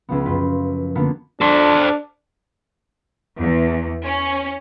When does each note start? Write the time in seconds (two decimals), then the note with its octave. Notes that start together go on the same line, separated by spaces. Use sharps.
0.09 C#2 F3 B3
0.26 F#2 F4 B4 C6
0.95 D3 A#3 B3 F4 B4
1.41 D4 A4 C5
3.39 E2
4.04 C#4